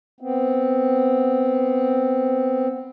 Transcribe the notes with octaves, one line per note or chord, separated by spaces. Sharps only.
B3 C4